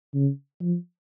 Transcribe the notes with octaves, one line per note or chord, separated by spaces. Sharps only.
C#3
F3